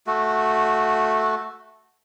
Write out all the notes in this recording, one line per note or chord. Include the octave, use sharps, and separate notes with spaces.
A3 F#4